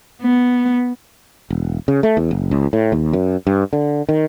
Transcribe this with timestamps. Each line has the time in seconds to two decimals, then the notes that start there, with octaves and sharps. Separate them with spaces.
0.22 B3
1.50 E1
1.88 C#3
2.03 A3
2.17 E2
2.31 F#1
2.51 C#2
2.73 A2
2.92 D#2
3.13 F#2
3.47 G2
3.73 D3
4.09 D#3